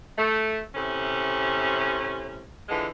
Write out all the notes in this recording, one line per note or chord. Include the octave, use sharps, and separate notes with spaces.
A3
A2 C3 C#4
D3 E3 F3 G#3